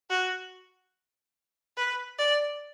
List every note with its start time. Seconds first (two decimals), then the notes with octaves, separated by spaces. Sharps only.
0.10 F#4
1.77 B4
2.18 D5